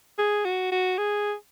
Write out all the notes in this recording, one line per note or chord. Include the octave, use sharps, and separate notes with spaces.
G#4
F#4
F#4
G#4